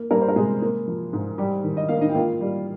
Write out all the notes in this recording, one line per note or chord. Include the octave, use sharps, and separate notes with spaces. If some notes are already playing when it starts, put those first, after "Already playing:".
Already playing: A#3
G3 A#3 A#4
C5
A#4
C3 G#3 G#4
A#3
F3
G#2
G3 G4
D#3
D#5
A#3 F5
D#4 D#5
G5
A#3 F4 F5
G3